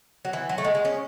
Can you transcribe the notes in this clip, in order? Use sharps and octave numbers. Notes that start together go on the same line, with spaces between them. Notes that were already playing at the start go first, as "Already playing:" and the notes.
F#3
E3
F#3
A3
G#3
G#3
C#4